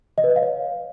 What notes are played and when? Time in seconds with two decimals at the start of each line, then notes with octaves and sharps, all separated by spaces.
0.18 D#5
0.24 B4
0.30 D#5
0.36 F5
0.42 C#5